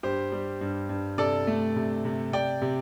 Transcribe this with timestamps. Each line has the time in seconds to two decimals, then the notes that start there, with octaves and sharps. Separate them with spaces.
0.03 G2 G4 C5
0.32 G3
0.61 G2
0.89 G2
1.18 C3 A4 D5
1.47 A3
1.76 C3
2.05 C3
2.33 C3 D5 G5
2.62 C3